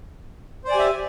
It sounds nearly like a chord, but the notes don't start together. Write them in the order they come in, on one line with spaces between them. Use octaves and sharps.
C5 D5 G#5 G4 E5